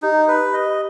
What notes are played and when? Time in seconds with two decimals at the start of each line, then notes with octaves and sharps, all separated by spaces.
0.02 D#4 G4
0.28 B4
0.53 D#5